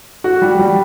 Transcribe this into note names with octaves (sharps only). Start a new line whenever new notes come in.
F#4
G3
G3